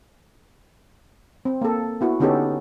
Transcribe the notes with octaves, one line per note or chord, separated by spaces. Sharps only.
C4
A#3 A4
B3 E4 F#4
D3 B3 C#4 D#4 G4 A4